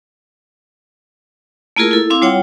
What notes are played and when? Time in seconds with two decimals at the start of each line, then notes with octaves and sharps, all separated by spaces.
1.76 A3 A#3 E4 F4 G#4 A#4
1.91 E4 A4
2.10 C4 E4 F5 D6
2.22 G3 F4 C#5 F#5 G5